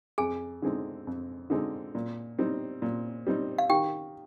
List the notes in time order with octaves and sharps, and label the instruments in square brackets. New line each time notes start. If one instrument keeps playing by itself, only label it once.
[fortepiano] F2 [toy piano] G#4 G#5
[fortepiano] D3 G#3 C4 D#4
F2
D3 G#3 C4 D#4
A#2
G3 C4 D#4
A#2
G3 C4 D#4
[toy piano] F5
[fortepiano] D#3 [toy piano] G4 G5